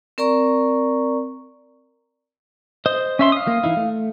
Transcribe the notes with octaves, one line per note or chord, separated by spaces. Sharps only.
C4 A#4 D5 A#5 C#6
C5 D#5
C#4 E5 C6
F5 D#6
A#3
E3 D#4 E4
A3